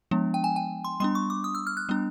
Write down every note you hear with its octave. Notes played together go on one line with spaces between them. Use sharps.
F3 G#3 B3 D4
G5
G#5
G5
C6
G3 B3 D4 C6
C#6
D6
D#6
E6
F6
F#6
G3 B3 D4